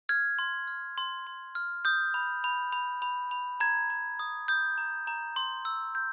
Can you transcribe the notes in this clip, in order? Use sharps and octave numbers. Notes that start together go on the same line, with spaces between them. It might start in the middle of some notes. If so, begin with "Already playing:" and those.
F6 G#6
C6
F6
C6
C6
F6
D#6 G6
B5
B5
B5
B5
B5
A#5 G#6
A#5
D#6
D#6 G6
A#5
A#5
C6
E6
G6